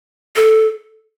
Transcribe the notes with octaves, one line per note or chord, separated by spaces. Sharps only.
A4